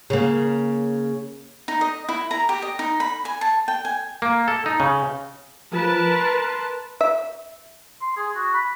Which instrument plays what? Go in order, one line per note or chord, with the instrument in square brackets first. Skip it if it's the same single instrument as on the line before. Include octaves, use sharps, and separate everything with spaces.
[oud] C#3 A#3
[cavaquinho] D#4
D#5
E4
A#5
G4
D#5
D#4
B5
G#5
A5
G5
G#5
[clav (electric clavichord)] A#3
A4
D#4
C#3
[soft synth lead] F3 [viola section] A#4 B4 A5
[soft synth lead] C6
[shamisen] E5
[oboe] C6
G#4
F#4
B5